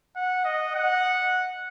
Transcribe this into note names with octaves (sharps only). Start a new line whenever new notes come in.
F#5
D#5
F#5